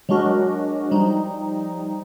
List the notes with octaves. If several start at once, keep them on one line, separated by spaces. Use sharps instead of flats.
F#3 G#3 D4 F#4 A#4
F3 G3 D#4